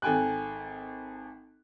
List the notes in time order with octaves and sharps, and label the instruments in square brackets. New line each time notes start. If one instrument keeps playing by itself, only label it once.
[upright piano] G#1 A4 G5 G#5 F#6